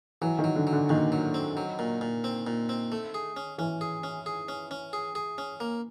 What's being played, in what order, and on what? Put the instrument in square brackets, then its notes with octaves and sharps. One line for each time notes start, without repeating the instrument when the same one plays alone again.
[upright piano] E3 [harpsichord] F#3
[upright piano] D#3
[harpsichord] F#3
[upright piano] D3
[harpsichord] F#3
[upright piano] D3
[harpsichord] A#2 [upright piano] D#3
[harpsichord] F#3
C4
F#3
A#2
A#2
C4
A#2
C4
A3
G#4
C#4
[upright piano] E3 [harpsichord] C#4
[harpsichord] G#4
C#4
G#4
C#4
C#4
G#4
G#4
C#4
A#3